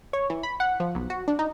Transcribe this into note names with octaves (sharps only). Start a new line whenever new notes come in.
C#5
E3
B5
F#5
F3
B1
F#4
D4
D#4